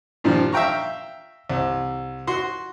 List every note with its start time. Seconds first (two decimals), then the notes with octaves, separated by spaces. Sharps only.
0.24 G2 A#2 D#3 F3
0.52 E5 F5 G5 A#5 C#6
1.50 C2
2.27 F#4 C6